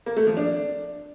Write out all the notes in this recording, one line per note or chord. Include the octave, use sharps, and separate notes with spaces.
A#3
A3
F3
D4